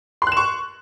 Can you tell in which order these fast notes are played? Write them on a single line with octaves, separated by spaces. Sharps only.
C6 F#6 E7 C#6